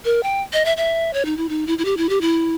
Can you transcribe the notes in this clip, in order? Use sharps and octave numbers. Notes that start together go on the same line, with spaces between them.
A#4
G5
D#5
E5
E5
C#5
D#4
E4
D#4
E4
E4
G4
E4
G4
E4